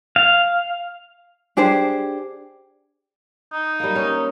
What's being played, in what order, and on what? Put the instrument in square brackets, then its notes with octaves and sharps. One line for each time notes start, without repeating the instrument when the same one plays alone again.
[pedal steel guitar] F5
[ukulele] D4 G4 G#4 C5
[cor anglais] D#4
[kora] G3 A#3
C#4